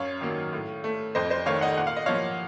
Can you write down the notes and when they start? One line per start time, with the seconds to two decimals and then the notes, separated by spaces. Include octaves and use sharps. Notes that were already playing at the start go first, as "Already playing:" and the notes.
Already playing: F#2 C#5 F5
0.21 D#3 F#3 A#3
0.53 A2
0.84 A3
1.15 F2 C5 D#5
1.30 C5 D#5
1.46 D#3 A3 C#5 F5
1.61 D#5 F#5
1.77 A#2 F#5
1.87 F5
1.97 D#5
2.06 F3 A#3 C#5 F5